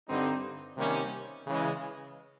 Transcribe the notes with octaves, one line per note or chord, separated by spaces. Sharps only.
G2 D3 G3 C4 D#4
C3 D#3 G3 A#3 C#4
C#3 E3 G#3